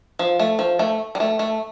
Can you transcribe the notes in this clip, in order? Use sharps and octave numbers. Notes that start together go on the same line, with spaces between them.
F3
A3
F3
A3
G3
A3
A3